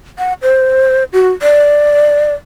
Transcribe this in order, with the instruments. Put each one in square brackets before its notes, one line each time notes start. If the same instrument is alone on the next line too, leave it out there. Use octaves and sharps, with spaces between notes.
[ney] F#5
C5
F#4
D5